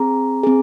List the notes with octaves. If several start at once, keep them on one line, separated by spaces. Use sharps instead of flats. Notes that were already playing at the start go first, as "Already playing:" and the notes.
Already playing: C4 G#4 A#5
C4 G#4